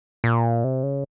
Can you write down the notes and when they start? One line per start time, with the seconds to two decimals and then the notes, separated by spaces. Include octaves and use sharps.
0.24 A#2
0.64 C3
0.83 C#3